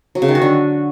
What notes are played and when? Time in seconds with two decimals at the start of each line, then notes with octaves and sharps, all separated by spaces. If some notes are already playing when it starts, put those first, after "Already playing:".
0.15 F#3
0.22 C#3
0.28 D#3
0.35 F#4
0.42 D3